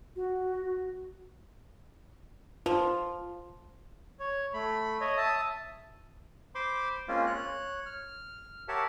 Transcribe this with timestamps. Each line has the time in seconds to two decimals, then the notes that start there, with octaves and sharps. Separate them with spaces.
0.16 F#4
2.66 F3 F4
4.20 C#5
4.54 A3 B5
5.01 C#5 D#5
5.17 E5 A5 D#6
6.55 C5 B5 C6 D6
7.08 G#3 A#3 C4 C#4 F4
7.27 C#5 F#6
7.86 F6
8.68 G4 A#4 C#5 E5 F#5 A5